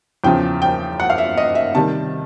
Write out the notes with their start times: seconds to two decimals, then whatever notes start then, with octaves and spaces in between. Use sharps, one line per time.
0.24 E2 C#3 F3 G5
0.62 G5
1.00 F#5
1.10 F5
1.18 E5
1.37 D#5
1.55 E5
1.75 C3 D#3 G3 A5